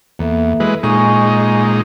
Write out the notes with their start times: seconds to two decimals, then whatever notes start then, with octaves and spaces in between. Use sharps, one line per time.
0.19 E2 A#3 A4 E5
0.60 E3 G#3 B4
0.83 A#2 G#3 D#4 G#5 C#6